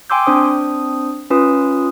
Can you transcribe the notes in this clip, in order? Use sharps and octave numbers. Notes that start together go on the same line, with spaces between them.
G5 G#5 C6 D6 E6 G6
C4 D4 C5 D#6
C#4 F4 B4 D#6